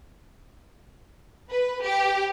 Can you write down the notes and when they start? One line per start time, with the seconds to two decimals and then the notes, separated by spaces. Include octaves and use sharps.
1.50 B4
1.83 G4